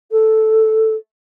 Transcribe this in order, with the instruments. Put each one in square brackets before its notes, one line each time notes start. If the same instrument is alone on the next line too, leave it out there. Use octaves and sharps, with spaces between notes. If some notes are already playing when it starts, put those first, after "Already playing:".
[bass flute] A4